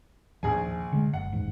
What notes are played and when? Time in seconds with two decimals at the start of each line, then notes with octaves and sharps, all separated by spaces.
0.43 A#1 D#2 F3 G#4 G#5
0.92 D3 G3 G#3
1.13 F#1 F#5
1.32 A1 D#2 G#2